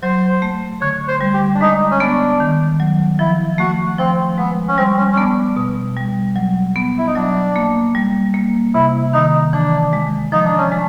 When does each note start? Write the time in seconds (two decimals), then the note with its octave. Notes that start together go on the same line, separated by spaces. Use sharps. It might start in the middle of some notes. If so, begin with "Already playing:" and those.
0.03 F#3 C5
0.42 A3
0.81 D3 C#5
1.08 C5
1.21 G3
1.34 G4
1.55 D4
1.61 G#3 D#4
1.91 C#4
2.00 B3 D4
2.40 D#3
2.80 F#3
3.19 F3 E4
3.58 A3 F#4
3.99 F3 C4
4.38 G#3 B3
4.68 C#4
4.78 G3 C4
4.97 C#4
5.12 C#4
5.17 B3 D4
5.57 B2
5.97 G3
6.36 F#3
6.76 B3
6.98 E4
7.07 D#4
7.15 F#3 D4
7.56 A#3
7.95 G3
8.34 A#3
8.74 C3 E4
9.13 D#3 D#4
9.53 E3 D4
9.93 G#3
10.32 F3 D#4
10.45 D4
10.57 C#4
10.70 G#3 D4